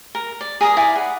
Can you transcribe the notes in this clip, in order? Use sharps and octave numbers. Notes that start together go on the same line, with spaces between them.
A#4
D5
G#4 A#4 D#6
E4 G#4 D5
F#5